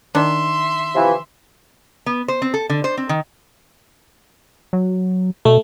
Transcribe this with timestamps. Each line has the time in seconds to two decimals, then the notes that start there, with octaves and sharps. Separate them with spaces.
0.15 D#3 D4 E5 C6
0.95 C3 E3 F3
2.06 B3
2.28 C5
2.42 C4
2.54 A4
2.70 D3
2.84 C5
2.97 C4
3.09 D#3
4.73 F#3
5.45 B2 A3